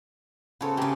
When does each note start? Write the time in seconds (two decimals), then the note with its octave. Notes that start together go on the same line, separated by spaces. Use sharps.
0.61 C#3 B3 A4 C5 C#5
0.77 C#3 C4 G4 G#5 A#5